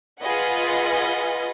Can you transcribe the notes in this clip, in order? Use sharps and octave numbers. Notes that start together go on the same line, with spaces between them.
F4 G#4 B4 D#5 F#5 G#5